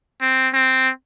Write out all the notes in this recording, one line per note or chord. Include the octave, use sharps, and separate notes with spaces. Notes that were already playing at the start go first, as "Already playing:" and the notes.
C4
C4